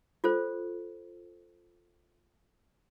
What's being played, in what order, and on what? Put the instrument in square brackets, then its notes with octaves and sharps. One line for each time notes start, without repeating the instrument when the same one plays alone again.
[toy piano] F4 A4 C5